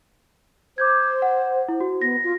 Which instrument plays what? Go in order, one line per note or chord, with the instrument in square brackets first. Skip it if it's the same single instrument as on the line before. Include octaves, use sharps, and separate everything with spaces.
[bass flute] C5 [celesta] D6 G6 G#6
[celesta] F#5
E4
F#4
[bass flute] B3 [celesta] A#6
[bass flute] F4